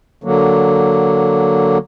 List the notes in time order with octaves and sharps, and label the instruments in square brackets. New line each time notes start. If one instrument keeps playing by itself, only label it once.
[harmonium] D3 F#3 A#3